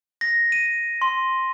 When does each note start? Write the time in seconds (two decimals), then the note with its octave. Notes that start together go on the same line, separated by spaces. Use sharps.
0.21 A#6
0.52 D#7
1.02 C6